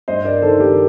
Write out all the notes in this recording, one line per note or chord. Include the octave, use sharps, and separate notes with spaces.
G2 C5 D#5
A#4 D5
D#3 A4 C5
G4 A#4